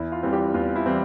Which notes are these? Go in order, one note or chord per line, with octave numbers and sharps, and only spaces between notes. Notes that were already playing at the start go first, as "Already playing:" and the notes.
Already playing: E2 E4
F4
E3 G3 C4
G4
E2 F4
E4
E3 G3 C4